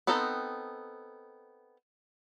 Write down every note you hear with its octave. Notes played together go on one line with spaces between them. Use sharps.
B3 C4 D#4 A4 A#5